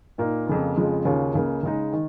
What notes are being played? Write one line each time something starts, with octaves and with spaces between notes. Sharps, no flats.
A#2 A#3 D#4
F2 C#3 A#3
F2 C#3 F3 G#3
D#2 C#3 A#3 C#4 F4
C#2 C#3 A#3
C#3 G#3 D#4
D#3